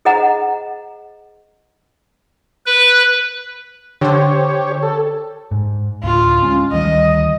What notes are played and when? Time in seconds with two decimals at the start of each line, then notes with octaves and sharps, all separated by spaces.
0.05 G#4 C5 D#5 F#5 A#5
2.66 B4
4.01 D3 G4 C5 C#5
4.83 A4
5.51 G#2
6.03 D1 D2 A2 F4
6.43 G#3 C#4
6.72 D2 D#3 G3 D#5